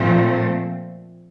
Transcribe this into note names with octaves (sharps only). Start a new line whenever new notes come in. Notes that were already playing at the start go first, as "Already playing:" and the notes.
Already playing: A#2 F3 A3 C4